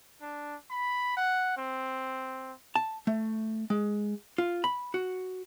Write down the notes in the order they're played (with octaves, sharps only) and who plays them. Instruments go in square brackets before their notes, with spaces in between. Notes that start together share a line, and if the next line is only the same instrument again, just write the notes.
[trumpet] D4
B5
F#5
C4
[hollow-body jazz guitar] A5
A3
G#3
F4
B5
F#4